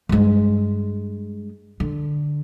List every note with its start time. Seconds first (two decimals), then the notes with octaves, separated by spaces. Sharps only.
0.09 G2 G#3
1.80 D3